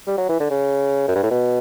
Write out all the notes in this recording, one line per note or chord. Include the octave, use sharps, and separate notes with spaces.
G3
F#3
E3
D3
C#3
F#2
G2
A2
B2